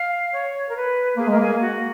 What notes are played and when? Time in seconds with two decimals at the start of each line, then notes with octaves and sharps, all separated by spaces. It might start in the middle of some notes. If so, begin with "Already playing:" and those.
Already playing: F5
0.32 C#5
0.68 A#4
0.75 B4
1.17 A#3 G#4
1.28 G#3 A#4
1.37 A#3 G#4
1.60 F#4